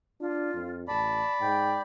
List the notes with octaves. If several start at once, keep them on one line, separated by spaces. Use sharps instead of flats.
D4 F4
F2
A1 D5 A5 B5
G#2 G5